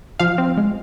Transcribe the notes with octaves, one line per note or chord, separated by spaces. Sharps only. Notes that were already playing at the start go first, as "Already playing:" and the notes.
F3 F5
C4
G#3